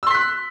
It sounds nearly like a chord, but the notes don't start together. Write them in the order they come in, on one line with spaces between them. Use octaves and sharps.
E6 C6 B6 F#6